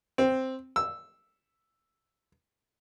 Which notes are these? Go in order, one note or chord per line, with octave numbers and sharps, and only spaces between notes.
C4
E6